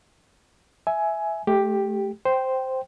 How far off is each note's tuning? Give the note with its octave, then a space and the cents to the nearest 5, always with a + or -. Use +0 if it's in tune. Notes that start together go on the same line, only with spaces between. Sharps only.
E5 +0 G#5 +15
A3 -25 G4 +5
C5 +0 G5 -10